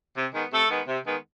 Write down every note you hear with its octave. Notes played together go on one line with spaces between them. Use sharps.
C3
D#3 G#3 B3
C3 A3 A4
D#3 G#3 B3
C3
D#3 G#3 B3